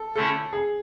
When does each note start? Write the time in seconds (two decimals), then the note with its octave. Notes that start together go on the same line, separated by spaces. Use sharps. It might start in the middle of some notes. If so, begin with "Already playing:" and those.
Already playing: A4
0.15 D3 A3 C#4 E4 A4
0.53 G#4